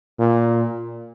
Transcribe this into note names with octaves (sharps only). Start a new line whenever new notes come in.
A#2